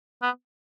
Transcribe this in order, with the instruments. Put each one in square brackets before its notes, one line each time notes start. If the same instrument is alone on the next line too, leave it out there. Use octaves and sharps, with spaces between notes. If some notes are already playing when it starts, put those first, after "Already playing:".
[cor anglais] B3